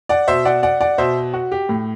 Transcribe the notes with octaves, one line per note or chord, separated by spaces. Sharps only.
D5 F#5
B2 C5 E5
D5 F#5
D5 F#5
D5 F#5
B2 C5 E5
F#4
G4
A2